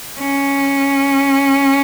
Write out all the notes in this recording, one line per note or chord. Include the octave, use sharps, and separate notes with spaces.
C#4